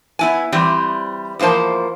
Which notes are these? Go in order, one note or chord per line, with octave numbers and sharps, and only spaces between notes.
B3 E4 G#5
E3 G3 C4
E2 F3 A#3 C5 A5